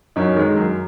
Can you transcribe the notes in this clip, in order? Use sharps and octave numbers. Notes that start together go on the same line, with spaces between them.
F#2 C#4 D#4
D#3 G#3
F#2